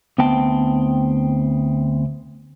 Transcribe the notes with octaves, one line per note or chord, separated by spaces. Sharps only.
D2 B3 C4 G5 A5